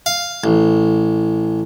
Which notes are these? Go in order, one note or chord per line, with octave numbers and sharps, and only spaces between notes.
F5
A1